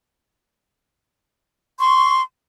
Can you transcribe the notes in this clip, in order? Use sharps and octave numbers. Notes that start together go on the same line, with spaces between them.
C6 C#6